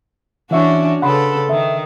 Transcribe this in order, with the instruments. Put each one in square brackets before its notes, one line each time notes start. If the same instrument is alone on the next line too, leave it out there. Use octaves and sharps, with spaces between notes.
[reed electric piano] E3 E5 C#6 [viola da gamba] C#4 D4 F#4
[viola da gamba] C#3 A4 B4 [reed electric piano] F#5 B5 C6
[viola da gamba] D#3 [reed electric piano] E5